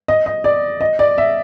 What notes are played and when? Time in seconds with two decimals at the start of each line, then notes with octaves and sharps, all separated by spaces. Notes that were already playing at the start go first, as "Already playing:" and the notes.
0.08 D#5
0.26 D#5
0.44 D5
0.81 D#5
0.99 D5
1.18 E5